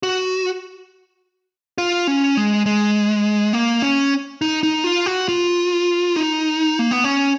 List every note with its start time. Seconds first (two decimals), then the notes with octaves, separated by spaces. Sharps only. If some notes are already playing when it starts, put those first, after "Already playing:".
0.03 F#4
1.78 F4
2.07 C#4
2.37 G#3
2.66 G#3
3.53 A#3
3.82 C#4
4.41 D#4
4.63 D#4
4.84 F4
5.06 F#4
5.29 F4
6.16 D#4
6.79 A#3
6.91 B3
7.04 C#4